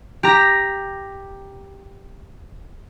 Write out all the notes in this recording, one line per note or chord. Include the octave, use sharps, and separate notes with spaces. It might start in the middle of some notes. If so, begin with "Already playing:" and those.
G4 A#5 A#6